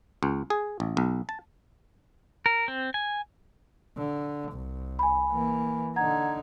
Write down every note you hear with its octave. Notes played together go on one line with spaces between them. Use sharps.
C#2
G#4
A1
B1
A5
A#4
C4
G#5
D3
C2
G#5 B5
E3 A#3
D3 D#4 F#5 A#5 G#6